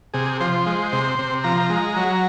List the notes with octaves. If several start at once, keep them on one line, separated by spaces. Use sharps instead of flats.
C3 G#4
F3 C5
G#3
C3
C3
F3 A#5
G#3
F#3